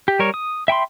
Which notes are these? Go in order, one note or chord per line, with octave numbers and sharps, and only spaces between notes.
G4
G3 A#4 C#5
D#6
E5 G5 B5 C6